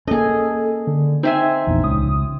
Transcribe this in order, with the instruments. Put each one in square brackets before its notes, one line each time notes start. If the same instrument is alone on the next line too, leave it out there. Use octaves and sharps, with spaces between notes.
[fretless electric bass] A#3 C#4 [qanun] G#4 D#5 [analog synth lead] A4
[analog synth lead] D3
[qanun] C4 E5 G#5 [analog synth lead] D#4
[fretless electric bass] A#1 E2
[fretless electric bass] C#2 C#4 [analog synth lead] D#6